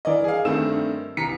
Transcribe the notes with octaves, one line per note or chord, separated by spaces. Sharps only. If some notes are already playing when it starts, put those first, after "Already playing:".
E3 A#4 D5 D#5
G#4 F5
G2 D#3 A3 C4 E6 E7
C2 E3 A#5 B6 C#7